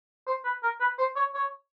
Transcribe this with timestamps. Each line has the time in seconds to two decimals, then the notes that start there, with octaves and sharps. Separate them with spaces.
0.27 C5
0.45 B4
0.63 A#4
0.80 B4
0.99 C5
1.16 C#5
1.34 C#5